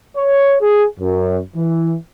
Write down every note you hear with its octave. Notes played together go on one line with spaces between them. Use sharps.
C#5
G#4
F#2
E3